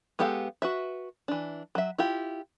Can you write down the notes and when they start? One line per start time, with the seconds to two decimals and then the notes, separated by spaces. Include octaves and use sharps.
0.19 G#3 B3 G4 A4 F5
0.62 F#4 B4 E5
1.28 E3 D4
1.75 F#3 E5
1.98 E4 F4 G4